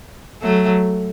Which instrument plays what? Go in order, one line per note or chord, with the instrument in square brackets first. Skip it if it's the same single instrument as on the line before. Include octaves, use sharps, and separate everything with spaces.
[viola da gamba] F#3 A3